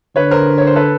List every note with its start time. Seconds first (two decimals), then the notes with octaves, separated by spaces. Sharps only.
0.16 D3 B4 C#5
0.31 A#4 C5
0.58 C#5
0.67 C5
0.76 A4 B4